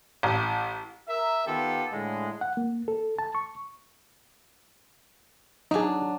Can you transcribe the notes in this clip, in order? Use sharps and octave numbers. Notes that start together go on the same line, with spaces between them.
A1
A#4 E5
D#3 B3 F4 G4 A4
A2 D3 G#3
F#5
A#3
A4
A5
C#6
F#3 D4 D#4 G#4